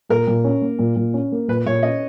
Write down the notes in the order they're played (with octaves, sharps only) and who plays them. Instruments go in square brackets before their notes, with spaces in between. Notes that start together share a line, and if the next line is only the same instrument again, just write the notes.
[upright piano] A#2 [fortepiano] A#4
[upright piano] A#2
C#4
A#3
A#2
A#2
C#4
A#3
[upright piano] A#2 [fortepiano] B4
[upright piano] A#2 [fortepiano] C#5
[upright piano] C#4 [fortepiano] D#5